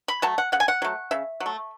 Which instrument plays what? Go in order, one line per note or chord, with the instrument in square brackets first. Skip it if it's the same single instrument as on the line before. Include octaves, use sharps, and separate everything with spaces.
[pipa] B5
F#3 A3 A5
F#5
C#3 F#5
G#5
F#5
F#3 A3
C#3 E5
F#3
A3